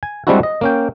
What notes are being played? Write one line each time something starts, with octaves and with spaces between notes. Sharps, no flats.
G#5
G3 G#3 C4 D4 E4 F#4
D#5
A#3 C#4 G5